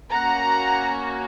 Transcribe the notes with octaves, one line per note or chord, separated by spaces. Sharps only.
A#3 C#4 F#4 F#5 A#5